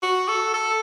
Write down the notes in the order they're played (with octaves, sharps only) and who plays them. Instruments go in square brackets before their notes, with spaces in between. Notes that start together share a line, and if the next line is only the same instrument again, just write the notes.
[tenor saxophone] F#4
A4
A4